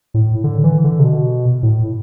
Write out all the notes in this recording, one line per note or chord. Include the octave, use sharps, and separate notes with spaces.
A2
D3
E3
D3
C3
B2
A2